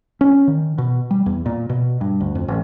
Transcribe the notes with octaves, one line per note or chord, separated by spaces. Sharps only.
C#4
D#3
B2
G3
E2
A#2
B2
G2
D2
F2
A1